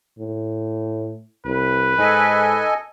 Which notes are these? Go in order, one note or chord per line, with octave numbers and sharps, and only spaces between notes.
A2
C2 B4
G#2 A4 D#5 G#5